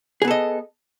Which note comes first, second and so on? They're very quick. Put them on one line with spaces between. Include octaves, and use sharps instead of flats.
G#4 B3 A4 D#5